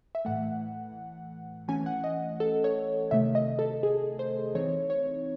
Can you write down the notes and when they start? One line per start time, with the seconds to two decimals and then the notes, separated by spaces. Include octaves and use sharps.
0.15 E5
0.25 A2 E3 A3 F#5
1.68 E3 A3 C#4 G#5
1.86 F#5
2.04 D#5
2.40 A4
2.64 C#5
3.11 C3 D#3 A3 E5
3.35 D#5
3.59 A4
3.83 G#4
4.19 C5
4.55 E3 C4 D#4 C#5
4.90 C#5